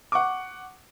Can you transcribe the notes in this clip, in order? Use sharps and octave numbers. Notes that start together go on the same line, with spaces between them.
F#5 C#6 D6